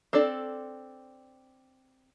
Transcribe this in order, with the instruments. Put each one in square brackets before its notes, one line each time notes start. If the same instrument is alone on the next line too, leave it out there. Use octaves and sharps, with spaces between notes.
[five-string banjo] C4 D4 A4 D5